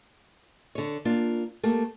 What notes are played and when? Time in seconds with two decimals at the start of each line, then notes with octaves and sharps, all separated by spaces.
0.75 D3 C#5
1.05 A#3 D4 F4
1.63 A3 A#3 G4